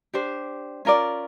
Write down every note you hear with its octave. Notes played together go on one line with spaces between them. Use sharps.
D4 G4 C5
C#4 F4 A#4 D5